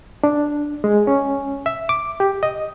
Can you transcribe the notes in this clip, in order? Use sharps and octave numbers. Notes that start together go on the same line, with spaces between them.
D4
G#3
C#4
E5
D6
G4
D#5